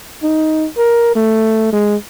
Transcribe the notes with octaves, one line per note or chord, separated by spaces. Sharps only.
D#4
A#4
A3
G#3